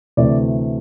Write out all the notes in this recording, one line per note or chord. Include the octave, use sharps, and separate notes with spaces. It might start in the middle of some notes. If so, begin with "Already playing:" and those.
D2 C3 E3 A3 D5